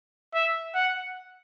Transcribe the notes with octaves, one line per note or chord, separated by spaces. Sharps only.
E5
F#5